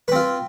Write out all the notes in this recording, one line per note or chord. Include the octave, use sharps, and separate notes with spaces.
C4 F4 B4